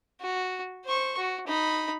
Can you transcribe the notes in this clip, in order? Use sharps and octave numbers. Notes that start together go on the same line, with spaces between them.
F#4
C5 C#6
F#4
D#4 B5